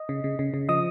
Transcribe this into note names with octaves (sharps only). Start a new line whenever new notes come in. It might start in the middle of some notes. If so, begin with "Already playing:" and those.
Already playing: D#5
C#3
C#3
C#3
C#3
F3 D#5 D#6